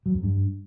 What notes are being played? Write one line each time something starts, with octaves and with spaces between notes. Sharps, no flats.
F#3
F2
G2